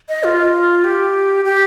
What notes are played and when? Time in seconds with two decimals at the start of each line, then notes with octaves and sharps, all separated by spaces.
0.09 D#5
0.24 F4
0.84 G4
1.45 G4